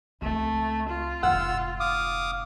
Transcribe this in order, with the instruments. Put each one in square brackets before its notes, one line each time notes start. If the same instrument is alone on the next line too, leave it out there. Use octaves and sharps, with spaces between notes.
[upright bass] C#2 C4 [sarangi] A3
[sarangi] F4
[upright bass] F1 G#2 [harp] F#5 F6 [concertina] E6
[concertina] F5 D6 D#6